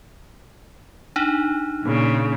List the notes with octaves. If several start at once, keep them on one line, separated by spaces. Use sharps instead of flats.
D4 D#4
A#2 C#3